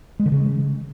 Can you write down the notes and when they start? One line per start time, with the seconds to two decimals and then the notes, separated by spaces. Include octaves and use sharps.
0.20 G#3
0.26 D3
0.32 C#3